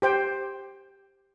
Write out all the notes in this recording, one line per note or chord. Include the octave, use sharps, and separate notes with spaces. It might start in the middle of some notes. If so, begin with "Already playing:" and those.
G4 C5 G5